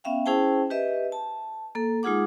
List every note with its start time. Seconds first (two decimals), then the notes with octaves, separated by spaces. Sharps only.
0.04 B3 C#4 E5 F5 G5
0.26 C#4 E4 G#4 C5 G5 A5
0.70 G4 B4 D#5 E5
1.12 A5
1.75 A#3 A4
2.03 G#3 D#4 F4 G#4 F#5 D6